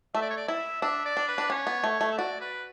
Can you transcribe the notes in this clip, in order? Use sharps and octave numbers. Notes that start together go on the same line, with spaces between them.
A3 E5
D5
C#5
D5
E4 E5
D4 E5
D5
D4
B4
D4
C#4 C#5
B3
A3
A3
E5
F#4 D5
B4